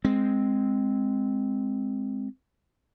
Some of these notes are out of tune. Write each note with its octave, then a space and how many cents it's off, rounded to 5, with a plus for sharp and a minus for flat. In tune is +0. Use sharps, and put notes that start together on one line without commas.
G#3 +0 C4 +0